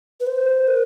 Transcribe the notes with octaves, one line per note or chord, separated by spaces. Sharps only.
B4
C5
A#4